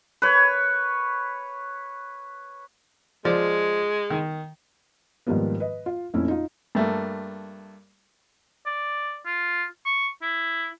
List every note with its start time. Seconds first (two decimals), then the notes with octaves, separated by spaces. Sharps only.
0.22 B4 C#5
3.25 F3 G#3 D5
4.10 D#3
5.27 G#2 D#3 F3 G3 A#3 B3
5.60 B4 D#5
5.86 F4
6.14 F2 A#2 A3 C#4 E4
6.28 D#4 F4
6.75 G2 A3 A#3
8.66 D5
9.26 F4
9.85 C#6
10.22 E4